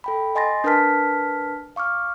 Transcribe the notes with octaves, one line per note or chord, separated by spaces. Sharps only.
A4 G5 B5
D#5 G#5 C6 A6 A#6
D4 A#4 B4 A5 F6 B6
F5 C#6 D6 F6